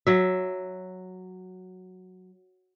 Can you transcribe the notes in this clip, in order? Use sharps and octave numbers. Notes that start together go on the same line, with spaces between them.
F#3 E5